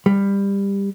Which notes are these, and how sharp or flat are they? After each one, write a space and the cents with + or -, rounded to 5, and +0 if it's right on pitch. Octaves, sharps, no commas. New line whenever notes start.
G3 +20